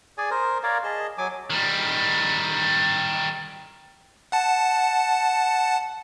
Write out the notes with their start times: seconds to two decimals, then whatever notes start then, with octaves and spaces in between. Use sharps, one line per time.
0.18 G#4 D5 G#5
0.30 A#4 C5
0.63 A#4 C#5 D5 F5
0.84 G#4 D#5 A5
1.18 F#3 G#5 D6
1.50 D#3 G3
4.32 F#5 A5